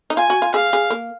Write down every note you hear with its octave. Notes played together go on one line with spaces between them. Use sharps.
D#4
F4 G#5
F#4
F4
G#4 F5
G#4
A#3